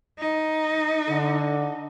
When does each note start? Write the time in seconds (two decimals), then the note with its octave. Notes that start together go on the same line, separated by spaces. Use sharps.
0.19 D#4
1.08 D3